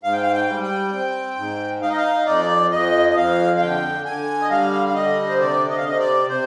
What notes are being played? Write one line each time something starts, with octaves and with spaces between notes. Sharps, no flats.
G#2 F5
G5
F5
G5
G3
G5
C4
G#2
D#4 F5
D#5
F5
F2 D5
F2 D#5
D#5
F2 F5
F5
D3 G5
D3 G#5
D#5
G3 F5
F5
D3 D#5
C5
C3 D5
D#5
F5
C3 D#5
D5
C3 C5